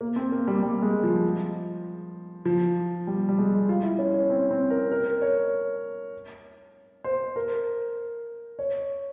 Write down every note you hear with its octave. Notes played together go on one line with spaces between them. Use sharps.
A#3
C4
A#3
G3
G3
G#3
F3
F3
G3
G3
G#3
F4
E4
C#4
C#4
C4
C4
A#4
A#4
C#5
C5
A#4
C#5